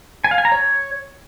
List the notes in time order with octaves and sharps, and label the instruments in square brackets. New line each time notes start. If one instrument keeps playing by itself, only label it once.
[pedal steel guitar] G#5
F5
G#5
A#5
C#5